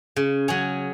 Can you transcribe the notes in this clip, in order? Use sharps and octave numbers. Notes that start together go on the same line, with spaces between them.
C#3
F#3 C#4 G#4